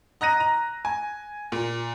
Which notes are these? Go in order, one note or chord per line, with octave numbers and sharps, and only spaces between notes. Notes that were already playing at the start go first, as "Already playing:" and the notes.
D#5 A#5 F#6 A#6 D#7
A#5
G#5
A#2